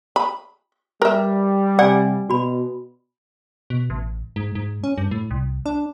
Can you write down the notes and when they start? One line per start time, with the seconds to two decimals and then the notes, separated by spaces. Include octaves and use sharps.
0.16 B5
1.02 G3 A#4 B4 E5
1.79 C3 D5 F#5 G#5
2.30 B2 F#4 B5
3.70 B2
3.90 A1
4.36 G#2
4.55 G#2
4.84 C#4
4.98 G2
5.11 A2
5.31 C2
5.66 D4